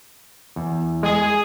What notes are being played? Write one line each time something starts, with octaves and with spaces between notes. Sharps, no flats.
E2
G#3 G#4